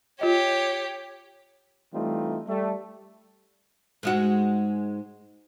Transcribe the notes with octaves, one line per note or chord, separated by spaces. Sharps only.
F4 G4 C#5 D#5
E3 G3 A3 C4 D#4 F4
G3 A3
G#2 G#3 F#4